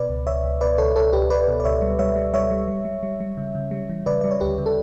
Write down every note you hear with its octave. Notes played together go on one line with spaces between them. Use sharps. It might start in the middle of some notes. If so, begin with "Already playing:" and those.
Already playing: B2 B4 D5
C#2
C#2 C#5 E5
C#2
B2 B4 D5
C#2 A4 C#5
C#2 A4 C#5
C#2 G4 B4
C#2 B4 D5
B2
D5
C#2 C#5 E5
G3
G3 C#5 E5
G3
G3 C#5 E5
G3
G3
G3
G3
G3
C#3
C#3
G3
E3
C#3 B4 D5
G3 D5
C#5
D2 G4 B4
C#3
A4